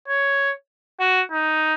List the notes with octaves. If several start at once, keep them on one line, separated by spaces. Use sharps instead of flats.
C#5
F#4
D#4